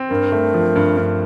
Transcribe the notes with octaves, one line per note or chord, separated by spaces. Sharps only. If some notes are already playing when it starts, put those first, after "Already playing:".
Already playing: C4
G2 A#4
A3
F3
G2
G2